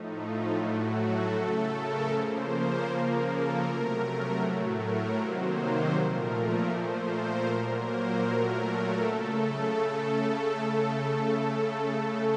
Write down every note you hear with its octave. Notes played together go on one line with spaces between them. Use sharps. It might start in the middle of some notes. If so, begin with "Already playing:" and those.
Already playing: A2 F3 A3 D#4
F4
A2 F#3 A3 F#4
A4
C#3 A3 A4
A#4
C#3 F3 A#3 C5
A#4
C#3 F3 A#3 A#4
A4
C3 F#3 A3 A#4
A2 F#3 A3
A#4
C3 D#3 F#3 A#3 C5
A#2 F3 A3 A#4
A#4
A#2 F3 A3 C5
A#4
A#2 F#3 A#3 A#4
C5
A#2 F#3 A3 A#4
A4
C#3 A3 A4